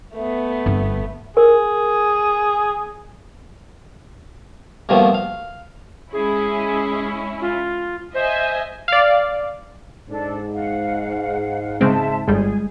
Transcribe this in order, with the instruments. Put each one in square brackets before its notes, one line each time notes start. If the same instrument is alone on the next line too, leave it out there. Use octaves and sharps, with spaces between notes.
[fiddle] A3 B3
[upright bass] G1 C4
[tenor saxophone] G#4 [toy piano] A#4
[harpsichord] G2 B2 D#3 F3 A3 A#3
F5
[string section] G#3 C#4 E4 [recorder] G#4
[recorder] F4
[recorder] C5 [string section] D#5 E5 G#5
[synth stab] D5 F5
[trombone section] G#2 [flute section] D4 A4
[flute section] F5 F#5
[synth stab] C#3 G#3 C4 [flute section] E5 A5 C6
[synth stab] G1 G3 [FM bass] G#3 [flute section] G#4